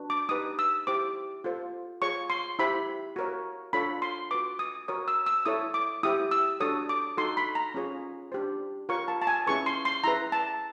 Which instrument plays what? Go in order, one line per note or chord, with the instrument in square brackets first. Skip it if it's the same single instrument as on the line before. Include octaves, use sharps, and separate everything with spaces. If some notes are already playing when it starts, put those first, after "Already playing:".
Already playing: [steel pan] D4 F#4 B4
D6
D#4 G4 B4 D#6
E6
E4 G4 C5 D6
F4 A4 C5
F4 G#4 C#5 C#6
C6
E4 G4 C5 B5
F#4 A#4 C#5
D4 F4 A4 C#5 B5
C6
F#4 B4 D6
D#6
F#4 A#4 C#5 D#6
E6
E6
E4 A4 C#5 D#6
D6
E4 G4 C5 D#6
E6
D4 F#4 A4 C#5 D#6
D6
D#4 F#4 A4 C6
B5
A#5
C#4 F4 G#4 C#5
D4 G4 C5
F4 A#4 C#5 C#6
A5
A5
G#5
C#4 E4 G#4 B4 C#6
C6
C6
E4 G#4 B4 A#5
A5